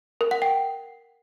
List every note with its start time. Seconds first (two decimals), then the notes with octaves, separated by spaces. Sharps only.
0.21 A#4
0.31 F#5
0.42 G5